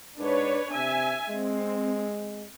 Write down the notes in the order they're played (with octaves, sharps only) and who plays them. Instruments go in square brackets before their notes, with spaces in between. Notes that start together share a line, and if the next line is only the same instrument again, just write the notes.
[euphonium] G#2 [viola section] D4 B4 C#5
[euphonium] C3 [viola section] E5 G#5
[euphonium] G#3 [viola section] C4